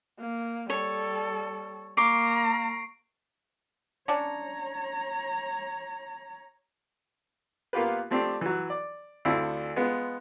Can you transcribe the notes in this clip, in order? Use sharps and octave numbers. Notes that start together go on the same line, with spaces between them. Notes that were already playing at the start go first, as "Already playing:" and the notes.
A#3
G3 A4 C#5
A#3 A#5 C#6 D6 C7 D7
C#4 D4 C#5 A#5
A#3 B3 F4 G4 B4
F3 A3 C4 D4 G4
E3 F#3
D5
D2 C4 D4 E4 F4 A4
G#3 B3 F4